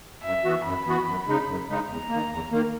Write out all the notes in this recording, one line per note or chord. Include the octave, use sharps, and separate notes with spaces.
F#2 E5
E3 B3 F#4
F#2 B5
E3 B3 F#4
F#2
C#3 G#3 D#4
F#2
C#3 G#3 D#4
E2 A#5
D#3 A#3
E2
D#3 A#3